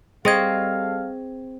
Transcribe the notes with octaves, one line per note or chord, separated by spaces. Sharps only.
G3 C4 G#4 A4 D#5 F5 G#6